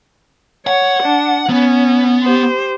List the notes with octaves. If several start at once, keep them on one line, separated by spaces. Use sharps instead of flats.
C#5 F#5
D4
B3 C#4
G4 C5